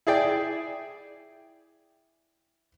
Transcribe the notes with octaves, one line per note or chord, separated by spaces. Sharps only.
E4 G#4 D5 G5